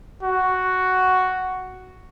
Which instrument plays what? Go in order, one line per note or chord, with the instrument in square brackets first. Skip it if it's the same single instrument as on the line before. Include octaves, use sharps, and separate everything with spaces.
[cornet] F#4